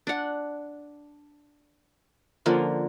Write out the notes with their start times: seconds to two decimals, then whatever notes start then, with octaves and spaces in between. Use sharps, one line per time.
0.07 D4 F#5
2.46 D3 F3 A#3 C#4